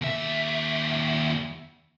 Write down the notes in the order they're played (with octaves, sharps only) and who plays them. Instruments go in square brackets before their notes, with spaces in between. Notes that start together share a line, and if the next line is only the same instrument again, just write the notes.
[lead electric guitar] D#2 E5